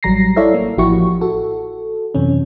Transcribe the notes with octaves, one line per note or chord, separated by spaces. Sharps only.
A1 F#3 G3 A#5 A#6 C7
E4 A4 C#5 D5 E5 F5
A#3
A1 F3 E4 F#4 G4 C#6
F#4 A4
F#2 C3 E3 C#4